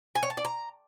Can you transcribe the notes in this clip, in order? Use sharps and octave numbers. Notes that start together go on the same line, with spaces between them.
G#5
C#5
A5
D5
A#5